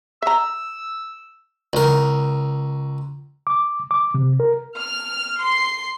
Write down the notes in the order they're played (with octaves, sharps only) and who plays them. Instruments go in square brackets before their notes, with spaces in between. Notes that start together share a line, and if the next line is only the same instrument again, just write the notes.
[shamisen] E5 A#5 [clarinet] E6
[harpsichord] C#2 A#4
[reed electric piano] D6
D6
C3
A#4
[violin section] F6
C6 C7